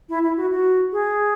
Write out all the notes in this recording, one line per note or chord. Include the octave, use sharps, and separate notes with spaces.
E4
E4
F#4
F#4
G#4